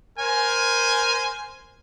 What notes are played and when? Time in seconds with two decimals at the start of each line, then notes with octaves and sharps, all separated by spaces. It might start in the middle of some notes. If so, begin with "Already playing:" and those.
0.19 A#4 C5 G#5